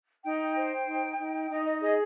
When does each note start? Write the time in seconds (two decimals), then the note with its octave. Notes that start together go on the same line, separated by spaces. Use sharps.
0.24 D#4 G5
0.56 C5
0.87 D#4
1.19 D#4
1.50 D#4 D#5
1.66 D#5
1.81 G#4 D#5